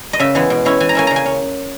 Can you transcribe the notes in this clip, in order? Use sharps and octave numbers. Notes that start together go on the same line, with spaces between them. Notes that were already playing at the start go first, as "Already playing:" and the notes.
D#5
C#3 E5
E3 G#3 B3
B2
G#3 C#4 E4
E3 G#5
A#5
A#3 C#4 E4 G#5
C#3 A#5
G#5
C#4